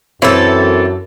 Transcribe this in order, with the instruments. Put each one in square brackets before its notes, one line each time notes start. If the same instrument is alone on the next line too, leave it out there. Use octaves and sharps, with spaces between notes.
[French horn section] F#2 [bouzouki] E3 A4 [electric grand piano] C4 C#5